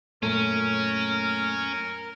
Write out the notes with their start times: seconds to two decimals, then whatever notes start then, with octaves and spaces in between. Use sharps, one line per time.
0.23 F#2 A#2 A3 C#4 A#4